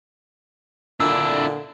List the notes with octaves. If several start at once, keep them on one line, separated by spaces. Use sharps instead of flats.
A#2 D3 D4 E4 E6